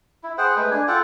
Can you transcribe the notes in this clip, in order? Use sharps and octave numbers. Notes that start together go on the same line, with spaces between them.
E4
G#4 C5 F#5 G5
G#3 A3 B4
D4 G#5
F4 A4 F#5 G5